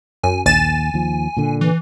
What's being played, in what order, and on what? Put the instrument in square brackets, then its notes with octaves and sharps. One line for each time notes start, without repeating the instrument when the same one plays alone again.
[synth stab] F#2 [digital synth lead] G#5
[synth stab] A#1 A6 E7 [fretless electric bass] D#2 [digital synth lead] G#5
[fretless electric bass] D#2 F3
A#2 D3
[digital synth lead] E3